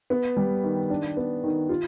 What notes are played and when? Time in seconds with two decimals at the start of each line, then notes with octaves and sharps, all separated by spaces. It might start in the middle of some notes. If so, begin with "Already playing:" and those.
0.10 B3
0.37 G3
0.64 D#3
0.90 D4
1.17 B3
1.44 D#3
1.69 F4